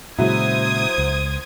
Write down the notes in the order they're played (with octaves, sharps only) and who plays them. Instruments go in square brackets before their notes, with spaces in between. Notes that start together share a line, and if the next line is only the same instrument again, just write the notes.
[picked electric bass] A#2 C#3 G#3 [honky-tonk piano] F#3 E4 [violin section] C5 D#6 G#6
[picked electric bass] C#2